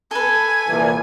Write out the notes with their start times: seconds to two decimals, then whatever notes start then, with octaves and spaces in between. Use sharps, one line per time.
0.11 A4 B4 G#5
0.67 C2 A#2 E3